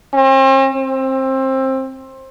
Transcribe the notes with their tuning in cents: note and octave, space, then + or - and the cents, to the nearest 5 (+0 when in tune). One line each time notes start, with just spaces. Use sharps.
C4 +45
C4 +20